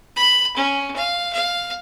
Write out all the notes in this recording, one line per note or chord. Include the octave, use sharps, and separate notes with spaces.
B5
C#4
F5
F5